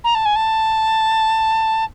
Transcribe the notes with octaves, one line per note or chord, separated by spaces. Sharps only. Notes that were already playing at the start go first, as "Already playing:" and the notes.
A#5
A5
G#5
A5